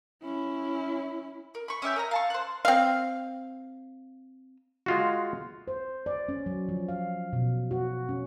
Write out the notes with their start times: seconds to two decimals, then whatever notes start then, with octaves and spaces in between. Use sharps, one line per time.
0.23 C#4 E4
1.55 A#4
1.68 B5 C#6
1.82 C#4 G4 E5 G6
1.96 A#4 D#5 A#5
2.11 F5 A5 C#6
2.30 C5 F#6
2.65 C4 F5
4.86 G#3 F4 F#4
5.68 C5
6.06 D5
6.29 C#4
6.46 F#3
6.69 F3
6.88 F5
7.33 B2
7.71 F#4
8.09 C#4